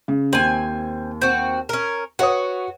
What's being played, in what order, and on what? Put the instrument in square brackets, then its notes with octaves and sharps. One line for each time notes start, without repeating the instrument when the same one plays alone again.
[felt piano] C#3
[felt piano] D#2 [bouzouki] C4 G#5
[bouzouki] C4 F#4
C#4 A#4
[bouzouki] F#4 [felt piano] B4 C#5 D#6